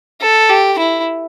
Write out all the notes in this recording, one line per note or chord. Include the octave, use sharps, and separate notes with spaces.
A4
G4
E4